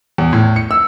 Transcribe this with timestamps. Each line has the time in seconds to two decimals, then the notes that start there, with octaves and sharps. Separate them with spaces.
0.18 E2
0.33 A2
0.56 C#7
0.71 E6